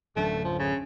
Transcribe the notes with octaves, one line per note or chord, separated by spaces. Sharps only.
D1 F#2 D3 A3
F3
C#3